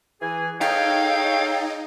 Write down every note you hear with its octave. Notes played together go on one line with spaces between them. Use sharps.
E3 G#4 G#5
D#4 G#4 A4 C#5 F5 G5